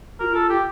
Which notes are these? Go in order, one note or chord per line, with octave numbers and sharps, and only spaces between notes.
F4 F#4 A#4
A4
G4